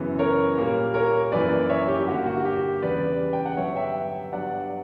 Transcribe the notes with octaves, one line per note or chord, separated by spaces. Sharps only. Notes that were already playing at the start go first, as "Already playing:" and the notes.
Already playing: F#2 C#3 E3 B3
A#4 C#5
A#2 G3 A#3
A#4 C#5
F#2 E3 A#3 B4 D5
C#5 E5
G4
G2 D3 A#3 F#4
F#4
G4
E2 C#3 G3 B4 D5
G5
F#5
G2 D3 F#3 B3 C#5 E5
E5 G5
G2 F#3 B3 D5 F#5